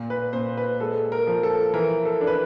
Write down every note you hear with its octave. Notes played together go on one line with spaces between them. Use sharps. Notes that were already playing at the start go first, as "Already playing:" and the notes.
Already playing: A#2
B4
A#2 C5
B4
G#3 A4
A#4
F3
A4
E3 A#4
A4
D4
B4